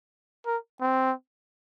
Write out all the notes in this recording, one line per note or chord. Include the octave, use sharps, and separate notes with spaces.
A#4
C4